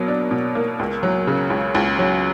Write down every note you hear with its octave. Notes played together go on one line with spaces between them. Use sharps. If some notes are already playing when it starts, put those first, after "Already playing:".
Already playing: B2 F#3 A#3
D4
B2
A#3
C#2
F#3
C#3
C#2
C#2
F#3